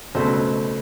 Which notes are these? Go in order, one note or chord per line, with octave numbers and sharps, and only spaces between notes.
C#2 B2 F#3 A3 C4 C5